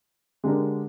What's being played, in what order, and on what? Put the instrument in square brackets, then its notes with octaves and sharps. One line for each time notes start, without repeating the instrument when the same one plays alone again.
[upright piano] D3 G#3 D4 G4 A#4